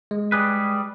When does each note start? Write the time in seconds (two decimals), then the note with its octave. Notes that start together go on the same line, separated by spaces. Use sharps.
0.11 G#3
0.32 G3 G#4 B4